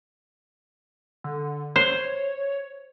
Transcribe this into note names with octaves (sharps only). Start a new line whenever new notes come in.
D3
C5 C#5